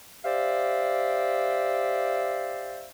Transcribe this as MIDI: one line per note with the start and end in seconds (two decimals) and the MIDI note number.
0.25 2.89 67
0.25 2.89 72
0.25 2.89 74
0.25 2.89 76
0.25 2.89 77